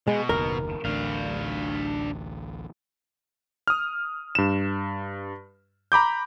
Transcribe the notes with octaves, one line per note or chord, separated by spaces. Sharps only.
B2 G#3
F#1 D#2 A#4
A1 D2 D4 F5
D#6 F6
G2 E7
A#5 B5 D6 G6